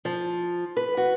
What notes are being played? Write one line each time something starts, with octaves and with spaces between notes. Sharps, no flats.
F3
B4
F#4